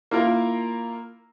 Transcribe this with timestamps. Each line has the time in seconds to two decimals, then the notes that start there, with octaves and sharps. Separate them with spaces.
0.11 A#3 E4 F4 A#4